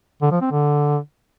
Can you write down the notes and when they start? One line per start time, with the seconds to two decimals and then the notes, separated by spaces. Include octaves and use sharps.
0.22 D3
0.32 F3
0.41 C4
0.51 D3